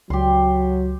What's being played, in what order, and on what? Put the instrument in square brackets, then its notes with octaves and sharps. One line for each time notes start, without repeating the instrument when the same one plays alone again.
[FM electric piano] C#2 [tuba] F#3 [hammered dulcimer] G4 C6